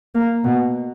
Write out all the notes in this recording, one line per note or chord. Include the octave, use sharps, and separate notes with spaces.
A#3
B2